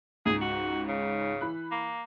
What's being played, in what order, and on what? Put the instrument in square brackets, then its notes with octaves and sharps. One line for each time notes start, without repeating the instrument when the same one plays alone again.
[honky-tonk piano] C#2 G#2 [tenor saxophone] G#4
[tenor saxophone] F#4
C#3
[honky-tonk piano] E3 B5 F#6
[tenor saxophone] A#3